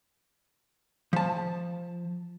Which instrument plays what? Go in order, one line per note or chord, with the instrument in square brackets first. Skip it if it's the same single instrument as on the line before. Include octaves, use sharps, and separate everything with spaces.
[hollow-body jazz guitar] F3 A5